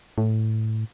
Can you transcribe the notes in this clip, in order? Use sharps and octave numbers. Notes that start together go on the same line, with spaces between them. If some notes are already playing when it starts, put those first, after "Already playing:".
A2